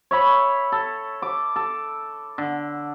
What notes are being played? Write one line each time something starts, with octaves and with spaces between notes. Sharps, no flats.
C#5 E5 B5
A4
D6
A4
D3